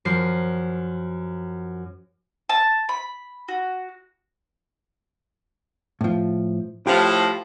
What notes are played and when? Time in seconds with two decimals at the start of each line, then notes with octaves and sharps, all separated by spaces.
0.05 F#2 F3 C7
2.49 A5
2.89 B5
3.48 F#4
6.01 A2 F3
6.87 A2 F3 G4